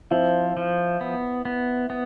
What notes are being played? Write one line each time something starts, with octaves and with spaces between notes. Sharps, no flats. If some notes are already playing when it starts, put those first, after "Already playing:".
F3 C4 E4
F3
B3
B3
B3